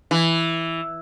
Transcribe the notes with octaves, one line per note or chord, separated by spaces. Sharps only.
E3